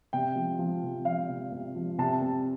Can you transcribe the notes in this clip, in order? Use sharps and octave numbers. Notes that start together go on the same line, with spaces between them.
C3 G5
F3
F3
C3
F3 F5
C3
C3
F3
C3 A5
C3